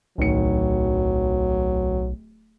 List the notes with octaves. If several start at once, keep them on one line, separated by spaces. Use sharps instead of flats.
D1 B1 D#3 F#3 C#7